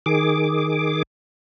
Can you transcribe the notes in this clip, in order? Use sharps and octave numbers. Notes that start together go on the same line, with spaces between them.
D#3 G#4 D6